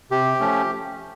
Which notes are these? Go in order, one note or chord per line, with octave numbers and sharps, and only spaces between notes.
C3 G4
F3 A3 C#4